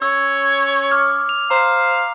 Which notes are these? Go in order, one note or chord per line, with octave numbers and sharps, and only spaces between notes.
C#4 C#5 E6
D6 F6
F7
C5 F5 A#5